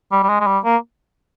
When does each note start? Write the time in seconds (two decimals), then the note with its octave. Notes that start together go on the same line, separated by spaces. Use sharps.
0.12 G3
0.23 G3
0.29 G#3
0.40 G#3
0.47 G3
0.64 A#3